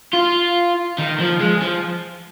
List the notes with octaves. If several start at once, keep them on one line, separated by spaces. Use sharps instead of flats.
F4
D#3
F3
G#3
F3